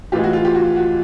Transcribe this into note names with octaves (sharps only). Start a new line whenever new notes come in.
A2 E3 G#3 F4 G4
F#4
F4
F4 G4
F#4
F#4